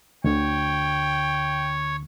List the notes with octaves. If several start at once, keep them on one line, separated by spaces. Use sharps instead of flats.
D2 D3 C#5 G5